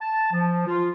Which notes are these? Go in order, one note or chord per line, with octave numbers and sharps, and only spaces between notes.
A5
F3
F4